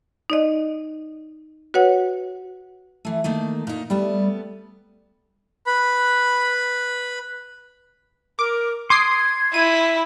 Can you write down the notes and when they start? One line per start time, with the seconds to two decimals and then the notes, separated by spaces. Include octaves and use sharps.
0.30 D#4 D5 D#5
1.74 F#4 B4 C#5 F#5
3.05 E3 A3
3.24 D#3 A3 A#3
3.67 A#2 D#4
3.90 G3 A3 B3
5.66 B4 B5
8.39 A#4 D6
8.90 C6 D6 D#6 G#6 C7
9.54 E4 D#7